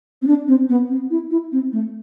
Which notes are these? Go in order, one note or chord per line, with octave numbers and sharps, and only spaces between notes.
C4
D4
C4
B3
C4
E4
E4
C4
A3